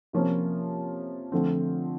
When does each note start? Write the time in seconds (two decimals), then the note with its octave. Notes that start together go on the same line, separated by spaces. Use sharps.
0.13 C3 F3 A#3 C#4
1.32 D3 F3 A3 C4